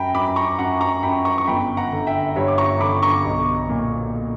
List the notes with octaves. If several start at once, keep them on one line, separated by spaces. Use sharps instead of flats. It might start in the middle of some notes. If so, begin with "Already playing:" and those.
Already playing: F#2 G5 A#5 B5
F#2 B5 D6
B5
A#5 C#6
F#2 F#5 A#5
A#5 C#6
F#2 G5 B5
A#5 C#6
C#6
G1 G5 B5
F#5 A#5
D3
E5 G5
G2 C#5 E5
D6
A#5 C#6
D3 B5 D6
A#5 C#6
B1
A#2